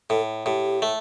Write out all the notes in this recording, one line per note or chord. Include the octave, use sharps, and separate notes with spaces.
A2 A4
A2 G4
A3